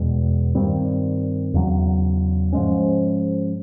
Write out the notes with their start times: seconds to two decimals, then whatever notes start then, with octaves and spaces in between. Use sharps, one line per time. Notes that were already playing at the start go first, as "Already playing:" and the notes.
Already playing: E2 B2 G#3
0.55 G2 D#3 G3 C4
1.54 E2 C#3 F#3
2.53 G#2 F3 G#3 C#4